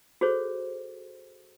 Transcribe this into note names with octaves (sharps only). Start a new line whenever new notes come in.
F#4 G#4 A4 C5 C#5